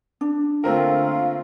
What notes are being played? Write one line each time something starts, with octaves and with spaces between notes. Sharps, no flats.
D4
D3 A3 A#3 C4 F4 A#4 F5